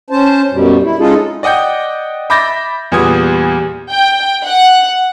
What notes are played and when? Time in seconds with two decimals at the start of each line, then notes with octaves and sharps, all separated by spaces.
0.10 C#4 C5 A5
0.51 F#2 B2 G3
0.83 E4
0.99 G#3 C#4 D#4 F4 G#4 A4
1.43 D5 D#5 F#5 G5 G6
2.30 E5 B5 D6 G6 A6 A#6
2.92 E2 A#2 G3 B3 D#6 G#6
3.89 G5
4.43 F#5